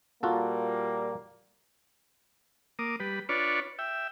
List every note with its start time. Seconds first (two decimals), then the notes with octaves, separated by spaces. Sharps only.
0.23 A#2 G3 A#3 F4 F#4 A4
2.79 A#3 D6 D#6
3.00 G3 B4
3.29 D4 F4 B4 C#5 D5 C#6
3.79 E5 G5